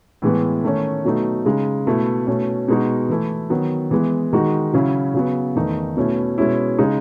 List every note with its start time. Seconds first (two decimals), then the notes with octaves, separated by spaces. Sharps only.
0.22 A2 E3 G#3 B3
0.64 D#3 A3 C#4
1.05 B2 F#3 A3 D#4
1.46 C#3 G#3 D#4
1.87 B2 A3 E4
2.27 B2 A3 C#4
2.68 B2 G#3 D#4 F#4
3.09 E3 A3 E4
3.50 D#3 F#3 B3
3.91 E3 G#3 B3
4.33 D#3 G#3 D#4 F#4
4.73 C#3 F#3 C#4 E4
5.14 C#3 F#3 B3
5.56 E2 D#3 A3 D#4
5.97 B2 A3 C#4 E4
6.38 B2 G#3 C#4 E4
6.79 C#3 G#3 D#4